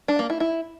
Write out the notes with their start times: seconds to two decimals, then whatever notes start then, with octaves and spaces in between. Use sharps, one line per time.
0.08 D4
0.19 A#3
0.30 E4
0.40 E4